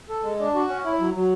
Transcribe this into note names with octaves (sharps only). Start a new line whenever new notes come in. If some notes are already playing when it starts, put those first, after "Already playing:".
A4
G#3
D4
F#4
C#4
E4
F#3
F#3